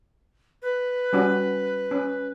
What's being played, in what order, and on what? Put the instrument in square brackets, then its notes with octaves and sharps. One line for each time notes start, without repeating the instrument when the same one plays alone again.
[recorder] B4
[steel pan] G3 C#4 F#4
C#4